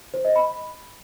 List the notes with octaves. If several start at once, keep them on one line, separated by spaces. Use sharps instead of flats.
C5
D#5
B5